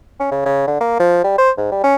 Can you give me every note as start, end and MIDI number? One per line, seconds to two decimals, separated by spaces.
0.20 0.28 61
0.31 0.41 49
0.45 0.63 49
0.67 0.79 50
0.81 0.98 58
0.99 1.20 53
1.24 1.34 55
1.38 1.51 72
1.57 1.67 44
1.71 1.81 55
1.83 1.96 61